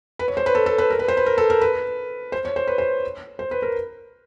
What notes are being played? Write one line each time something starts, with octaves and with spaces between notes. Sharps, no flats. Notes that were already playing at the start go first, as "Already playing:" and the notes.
B4
C#5
C5
B4
A4
A4
B4
A#4
B4
C5
B4
A#4
A4
A#4
B4
C5
C#5
C5
B4
C5
C5
B4
A#4